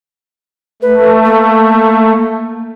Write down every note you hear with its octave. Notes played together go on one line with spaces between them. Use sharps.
A3 B4
A#3